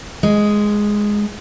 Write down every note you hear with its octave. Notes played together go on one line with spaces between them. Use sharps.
G#3